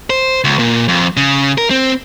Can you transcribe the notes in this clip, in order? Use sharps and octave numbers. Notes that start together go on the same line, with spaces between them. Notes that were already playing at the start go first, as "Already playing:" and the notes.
C5
C#2
A#2
F2
C#3
A#4
C4